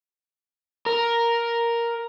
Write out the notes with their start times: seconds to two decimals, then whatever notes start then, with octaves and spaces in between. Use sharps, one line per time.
0.86 A#4